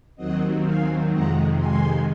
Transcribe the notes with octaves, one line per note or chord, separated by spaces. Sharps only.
D#2 D#3 F#3 C4 D#5 F#5
F5 G#5
F2 C3 D#3 G#3 F#5 A#5
G#5 C6